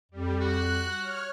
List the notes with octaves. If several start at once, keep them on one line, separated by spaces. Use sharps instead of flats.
F2 G3
F#4 F#6
C#5 F6